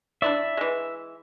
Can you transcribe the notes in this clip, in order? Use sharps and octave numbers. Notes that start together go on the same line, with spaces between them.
D4 E4 D5 E5
E3 G#3